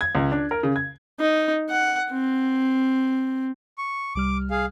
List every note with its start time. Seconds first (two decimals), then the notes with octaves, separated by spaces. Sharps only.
0.01 G#6
0.15 C#2
0.32 D4
0.51 A#4
0.63 C#3
0.76 G#6
1.20 D#4
1.70 F#5
2.11 C4
3.78 C#6
4.15 C2 G3 D6 F6
4.51 G#4 F5